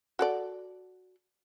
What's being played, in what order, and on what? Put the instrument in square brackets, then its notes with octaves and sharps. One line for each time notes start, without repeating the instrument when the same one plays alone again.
[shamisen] F#4 A4 D5